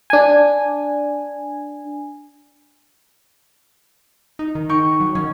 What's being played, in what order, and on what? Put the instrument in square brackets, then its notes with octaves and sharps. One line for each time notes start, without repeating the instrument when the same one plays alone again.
[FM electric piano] D4 G#5
[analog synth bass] D#4
D#3
[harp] D#4 G5 C#6
[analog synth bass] F#3
[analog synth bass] D#3 [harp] C#4